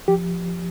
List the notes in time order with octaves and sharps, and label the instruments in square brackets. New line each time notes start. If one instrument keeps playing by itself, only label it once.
[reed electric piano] F3 G4